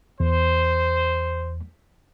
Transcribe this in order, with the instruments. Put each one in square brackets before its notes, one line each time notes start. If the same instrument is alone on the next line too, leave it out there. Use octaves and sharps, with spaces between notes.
[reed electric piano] E2 [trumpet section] C5